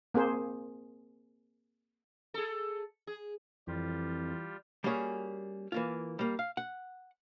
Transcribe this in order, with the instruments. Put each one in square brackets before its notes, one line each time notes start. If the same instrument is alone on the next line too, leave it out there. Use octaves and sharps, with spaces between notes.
[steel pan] A#3 C4 G#4 C5
[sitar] G#4 A4
G#4
[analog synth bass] F2 [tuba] E3 [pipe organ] G3 F4 G4
[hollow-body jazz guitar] G3 A#3 C#4 F#4 G#4
E3 A#3 F4
G3 A#3
F5
F#5